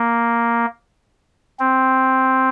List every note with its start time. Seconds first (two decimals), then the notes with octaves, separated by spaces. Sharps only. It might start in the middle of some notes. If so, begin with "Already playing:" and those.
Already playing: A#3
1.59 C4